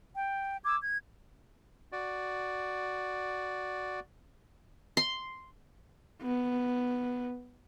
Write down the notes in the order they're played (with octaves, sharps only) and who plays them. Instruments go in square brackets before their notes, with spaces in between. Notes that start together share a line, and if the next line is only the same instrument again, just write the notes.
[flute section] G5
D6 E6 G#6
G#6
[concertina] F#4 D5
[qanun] C6
[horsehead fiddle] B3